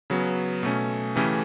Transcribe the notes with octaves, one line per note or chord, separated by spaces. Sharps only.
C#3 F#3 B3
B2 A3 C#4
C#3 E3 A3 C#4 G4